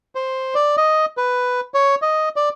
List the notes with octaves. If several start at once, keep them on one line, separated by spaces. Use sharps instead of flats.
C5
D5
D#5
B4
C#5
D#5
D5